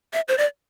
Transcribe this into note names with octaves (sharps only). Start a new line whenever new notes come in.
E5
C5
D5